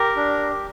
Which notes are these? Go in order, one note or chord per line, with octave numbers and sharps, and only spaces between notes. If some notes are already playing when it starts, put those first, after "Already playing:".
Already playing: G4 A#4
D4